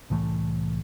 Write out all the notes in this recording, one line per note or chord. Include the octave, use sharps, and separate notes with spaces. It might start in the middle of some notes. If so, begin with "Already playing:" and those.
C2 A2 E3 A3